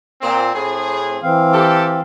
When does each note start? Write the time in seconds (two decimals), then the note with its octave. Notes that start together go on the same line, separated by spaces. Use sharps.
0.21 A#2 C4
0.54 A2 C4 G#4
1.23 E3 C4 F5
1.53 G4 A4